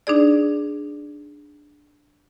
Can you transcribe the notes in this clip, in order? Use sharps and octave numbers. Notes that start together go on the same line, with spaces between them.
D4 D#4 G#4 D5